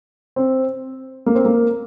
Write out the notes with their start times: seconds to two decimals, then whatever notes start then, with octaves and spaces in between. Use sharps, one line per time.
0.36 C4
1.26 A#3
1.35 C4
1.45 A#3